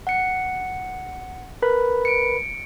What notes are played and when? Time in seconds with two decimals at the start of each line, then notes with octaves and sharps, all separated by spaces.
0.07 F#5 C#7
1.62 A#4 B4 B5
2.05 C#7 D7